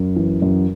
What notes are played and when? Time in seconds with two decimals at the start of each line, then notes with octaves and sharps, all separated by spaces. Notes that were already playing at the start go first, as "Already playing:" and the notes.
Already playing: F#2
0.16 E3
0.42 F#2